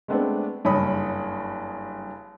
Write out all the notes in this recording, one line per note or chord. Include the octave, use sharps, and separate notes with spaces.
G#3 A3 B3 C4 D4 G#4
F#1 G2 C#5 B5 D#6